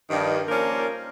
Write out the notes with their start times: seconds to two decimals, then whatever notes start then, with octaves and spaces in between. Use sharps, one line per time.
0.10 G2 D#3 F3
0.49 F3 A#3 C#4 A#4 C5 D5